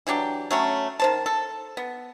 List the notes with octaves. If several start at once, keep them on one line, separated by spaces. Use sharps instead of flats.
E3 F#3 D4 G4
F#3 A3 C#4
D#3 C5 A5
A4
B3